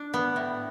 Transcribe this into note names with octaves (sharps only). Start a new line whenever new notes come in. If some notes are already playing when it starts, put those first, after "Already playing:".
Already playing: D4
B3
A2